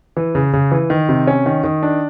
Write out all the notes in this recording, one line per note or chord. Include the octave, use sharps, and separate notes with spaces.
E3
C#3
C#3
E3
D#3
C3
C#4
D#3
D#3
D4